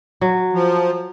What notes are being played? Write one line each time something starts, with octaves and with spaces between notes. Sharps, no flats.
F#3
F3